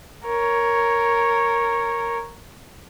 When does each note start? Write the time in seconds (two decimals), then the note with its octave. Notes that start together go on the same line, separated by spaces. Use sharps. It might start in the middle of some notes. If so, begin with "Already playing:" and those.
0.25 A#4 C#5